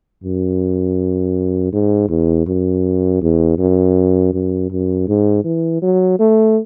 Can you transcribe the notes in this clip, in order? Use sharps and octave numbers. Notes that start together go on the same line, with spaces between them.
F#2
G#2
E2
F#2
E2
F#2
F#2
F#2
G#2
E3
F#3
A3